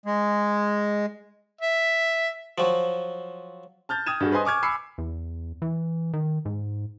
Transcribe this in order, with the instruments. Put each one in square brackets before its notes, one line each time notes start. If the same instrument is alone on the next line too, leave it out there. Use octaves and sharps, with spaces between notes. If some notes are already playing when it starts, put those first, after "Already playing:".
[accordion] G#3
[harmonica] E5
[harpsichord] F3 F#3
[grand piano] A5 F6 G6 A6
G5 D#6 F6 G#6 D#7 E7
G2 F#4 G#4
B4 C5 D#5 G#5 C6 D#6
G#5 C#6 D6 F6 G#6
G#5 B5 D6 E6 C7 C#7
[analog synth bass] E2
E3
D#3
G#2